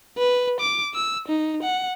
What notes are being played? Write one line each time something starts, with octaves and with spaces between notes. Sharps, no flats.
B4
D6
E6
D#4
F#5